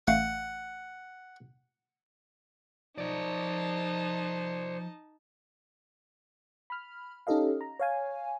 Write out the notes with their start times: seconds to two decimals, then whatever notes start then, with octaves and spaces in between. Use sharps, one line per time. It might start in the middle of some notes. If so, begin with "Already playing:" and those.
0.08 A1 A3 F5 F#5
2.98 F3 D#4 C5 D5 A5
6.70 B5 F6
7.27 C#4 D#4 G4 A4 D#5 F5
7.61 A#5
7.80 C#5 F5 G#5